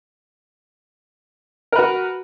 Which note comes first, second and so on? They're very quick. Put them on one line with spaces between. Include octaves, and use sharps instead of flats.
A#4 B4 F#4